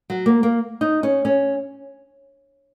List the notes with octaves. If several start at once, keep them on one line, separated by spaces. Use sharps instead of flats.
F#3
A#3
A#3
D#4
C#4
C#4